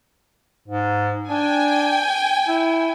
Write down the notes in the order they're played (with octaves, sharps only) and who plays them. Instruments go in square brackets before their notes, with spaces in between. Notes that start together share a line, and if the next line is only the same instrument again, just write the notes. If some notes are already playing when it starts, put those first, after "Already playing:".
[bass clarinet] G#2
[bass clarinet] D4 [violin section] G5 G#5
[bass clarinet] E4